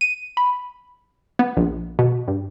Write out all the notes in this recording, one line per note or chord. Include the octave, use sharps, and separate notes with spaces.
D#7
B5
B3
A#1
B2
G2